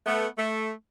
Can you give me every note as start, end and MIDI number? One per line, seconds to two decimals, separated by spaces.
0.06 0.27 57
0.06 0.27 59
0.38 0.70 57